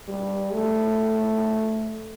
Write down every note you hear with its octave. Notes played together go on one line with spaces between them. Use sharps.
G3
A3